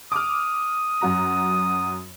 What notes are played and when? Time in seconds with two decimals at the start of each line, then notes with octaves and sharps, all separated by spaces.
0.12 D6 D#6 F6
1.01 F#2 F#4 A#5